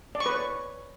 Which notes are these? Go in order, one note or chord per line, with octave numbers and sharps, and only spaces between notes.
D5
C#6
B4
C#5